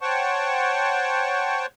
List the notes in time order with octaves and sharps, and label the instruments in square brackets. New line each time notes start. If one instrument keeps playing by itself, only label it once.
[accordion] C5 C#5 F#5 G5 A5 C#6